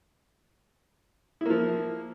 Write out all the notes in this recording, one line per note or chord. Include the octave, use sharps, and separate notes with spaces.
F3 A#3 E4